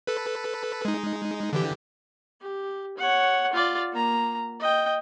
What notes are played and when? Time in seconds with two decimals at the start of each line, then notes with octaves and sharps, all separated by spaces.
0.07 A4 B4
0.85 G#3 D#4
1.53 D3 E3 G4
2.41 G4
2.98 C#5 F#5
3.53 F4 D5
3.93 A#3 A#5
4.60 D#5 G5